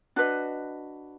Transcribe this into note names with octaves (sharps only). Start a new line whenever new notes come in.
D4 F#4 B4 D#5